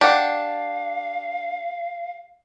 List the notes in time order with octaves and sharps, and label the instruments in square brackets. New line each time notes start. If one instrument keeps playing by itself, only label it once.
[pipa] D4 [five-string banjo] G4 F#5 [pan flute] F5